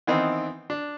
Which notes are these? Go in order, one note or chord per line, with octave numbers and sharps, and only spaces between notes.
D#3 E3 B3 C4 D#4
D4